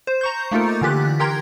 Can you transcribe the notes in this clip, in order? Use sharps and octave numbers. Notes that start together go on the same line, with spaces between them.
C5
A#5 C#6 G6
A3 A#3 D#4 F4 A4 A#4
D3 E3 F4 G4 F#6
G4 A#4 G5 A#5 C6 G#6